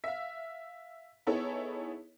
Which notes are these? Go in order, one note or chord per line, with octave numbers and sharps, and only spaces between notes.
E5 F5
B3 D#4 E4 G#4 A4 C#5